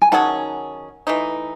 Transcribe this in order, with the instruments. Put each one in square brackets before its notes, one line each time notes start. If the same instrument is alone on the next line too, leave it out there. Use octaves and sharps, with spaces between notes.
[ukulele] G#5
[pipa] D#3 F#3 C#4 G#4 [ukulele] F#5 A5
[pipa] E3 A3 D#4